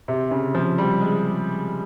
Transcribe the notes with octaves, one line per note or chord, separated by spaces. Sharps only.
C3
C#3
F3
G3
G#3